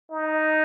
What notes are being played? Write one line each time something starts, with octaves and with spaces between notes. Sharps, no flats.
D#4